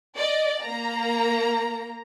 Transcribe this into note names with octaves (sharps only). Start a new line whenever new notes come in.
D5 D#5
A#3 A#5